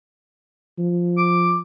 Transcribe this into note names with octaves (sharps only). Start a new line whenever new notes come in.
F3
D6